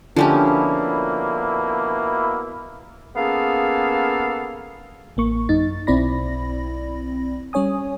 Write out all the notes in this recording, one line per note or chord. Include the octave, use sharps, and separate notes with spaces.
B2 D3 F3 A#3 C#4 E4 G4
A#3 B3 C#4 G#4 A4 F5
A1 A#3 C#6
F#2 D#4 A6
B1 C4 E4 D5 B5 A#6
G3 C#4 C#5 G#5 D#6